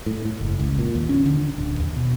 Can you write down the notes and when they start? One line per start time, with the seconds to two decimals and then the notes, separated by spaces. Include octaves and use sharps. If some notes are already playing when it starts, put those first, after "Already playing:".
0.06 A2
0.25 A2
0.41 F#1
0.59 C#2
0.79 A#2
0.95 D#2
1.09 C#4
1.26 D3
1.37 D4
1.58 D1
1.80 D#2
1.96 B2